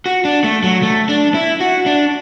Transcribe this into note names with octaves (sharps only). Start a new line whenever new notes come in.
F#4
D4
A3
F#3
A3
D4
E4
F#4
D4